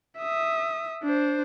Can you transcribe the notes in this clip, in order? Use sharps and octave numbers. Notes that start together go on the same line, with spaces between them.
E5 D#6
D4 C5